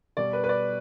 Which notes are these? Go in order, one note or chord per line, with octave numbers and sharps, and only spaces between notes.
B2 G3 D5
B4
B4
D5